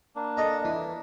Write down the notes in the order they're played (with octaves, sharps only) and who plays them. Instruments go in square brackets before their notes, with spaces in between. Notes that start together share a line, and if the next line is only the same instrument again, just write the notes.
[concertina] A#3 D4
[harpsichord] A4 D#5 A#5
E3